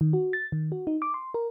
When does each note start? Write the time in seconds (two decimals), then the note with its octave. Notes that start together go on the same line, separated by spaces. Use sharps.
0.01 D#3
0.13 F#4
0.33 A6
0.52 D#3
0.72 F#4
0.87 D#4
1.02 D6
1.14 C6
1.34 A#4